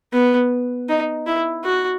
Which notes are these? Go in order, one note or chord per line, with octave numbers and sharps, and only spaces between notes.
B3
D#4
E4
F#4